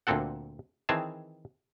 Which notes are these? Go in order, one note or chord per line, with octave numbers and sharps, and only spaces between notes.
D2 A#2 A#3 C4 A4 F#5
D#3 E3 C4 G#4 A5